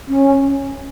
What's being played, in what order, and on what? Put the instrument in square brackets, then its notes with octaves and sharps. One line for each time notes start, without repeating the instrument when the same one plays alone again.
[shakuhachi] C#4